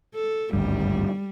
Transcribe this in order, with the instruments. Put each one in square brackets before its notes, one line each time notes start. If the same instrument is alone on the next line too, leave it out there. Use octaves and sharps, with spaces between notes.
[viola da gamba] A4
[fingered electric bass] G#1 D2 G2 [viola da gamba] G3